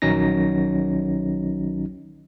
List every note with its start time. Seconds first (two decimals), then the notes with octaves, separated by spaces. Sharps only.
0.02 A#1 D#3 F#3 C#4 D#4 A#6